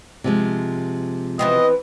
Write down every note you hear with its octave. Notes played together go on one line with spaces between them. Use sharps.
C3 F3 G#3
E3 B3 C4 D#5